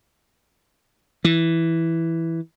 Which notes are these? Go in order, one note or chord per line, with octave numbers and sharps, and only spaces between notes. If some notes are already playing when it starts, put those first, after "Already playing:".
E3